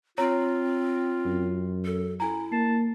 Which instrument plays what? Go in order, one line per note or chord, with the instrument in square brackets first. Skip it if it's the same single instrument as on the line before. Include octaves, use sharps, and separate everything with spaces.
[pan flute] C4 [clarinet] F4 [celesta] C#5 A#5
[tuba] F#2
[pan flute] A4
[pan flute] E4 [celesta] A4 G#5 A#5
[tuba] A#3 [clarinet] A5 [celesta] C7